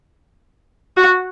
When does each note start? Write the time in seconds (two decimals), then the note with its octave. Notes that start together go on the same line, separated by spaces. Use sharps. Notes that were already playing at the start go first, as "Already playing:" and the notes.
0.97 F#4